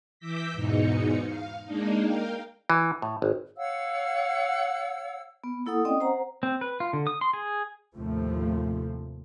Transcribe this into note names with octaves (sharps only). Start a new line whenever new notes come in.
E3 D6 E6 G6 A#6 B6
E2 G#2 B2 D#4 C#7
F5
G#3 A#3 D4 D#4
A#4 F5 G5
E3
A2
G#1
C#5 F5 F#5 E6
B3
A#3 E4 A4 F#5 D#6
C4 C#4 D5 D#5 G5 D#6
C5 F#5 A#5
C4
B4
F4
D3
D#6
C6
G#4
D#2 A2 C3 F3 A3